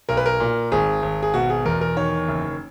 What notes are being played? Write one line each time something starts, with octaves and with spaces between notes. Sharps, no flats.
B1 A#4
B4
A#4
A#2
G#1 G#4
G#1
G#4
B2 F#4
G#4
E2 A#4
A#4
D#3 C#5
F#1